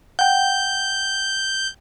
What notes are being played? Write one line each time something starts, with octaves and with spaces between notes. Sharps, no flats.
F#5 G5 G6